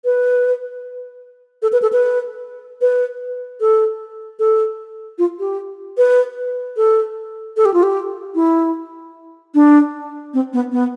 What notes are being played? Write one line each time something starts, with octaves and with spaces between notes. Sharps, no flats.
B4
A4
B4
A4
B4
B4
A4
A4
F4
G4
B4
A4
A4
G4
F4
G4
E4
D4
C4
B3
B3